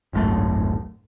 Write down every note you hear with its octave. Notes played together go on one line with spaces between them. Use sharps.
D1 G#1 F#2 A3